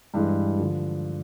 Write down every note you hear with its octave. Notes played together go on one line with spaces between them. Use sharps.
G2 E3 G#3
D3 F3